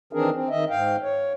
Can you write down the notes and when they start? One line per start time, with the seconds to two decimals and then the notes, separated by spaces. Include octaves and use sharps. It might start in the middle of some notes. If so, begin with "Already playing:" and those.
0.13 D#3 E3 C4 D4 G#4 A#4
0.33 C4
0.49 D#3 D#5 E5
0.70 G#2 F5 G5
1.02 C#5